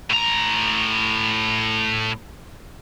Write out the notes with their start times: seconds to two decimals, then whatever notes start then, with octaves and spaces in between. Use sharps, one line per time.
0.10 A2 A#5